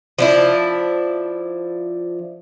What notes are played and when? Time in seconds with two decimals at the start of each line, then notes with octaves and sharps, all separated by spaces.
0.19 F3 D4 E4